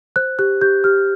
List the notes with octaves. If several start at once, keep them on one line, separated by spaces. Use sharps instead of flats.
C5 F#6
G4 F#6
G4 G6
G4 F6